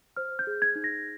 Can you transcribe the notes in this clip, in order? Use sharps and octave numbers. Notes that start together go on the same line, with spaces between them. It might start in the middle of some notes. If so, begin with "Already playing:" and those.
C5 F6
G6
G#4
G#6
D#4
A#6